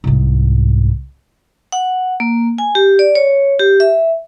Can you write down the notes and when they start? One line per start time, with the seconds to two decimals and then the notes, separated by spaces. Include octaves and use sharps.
0.04 C2 G#2
1.72 F#5
2.20 A#3
2.58 G#5
2.75 G4
2.99 D5
3.15 C#5
3.59 G4
3.80 E5